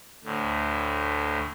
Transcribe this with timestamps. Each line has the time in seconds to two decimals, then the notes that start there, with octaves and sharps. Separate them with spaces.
0.24 D2 A2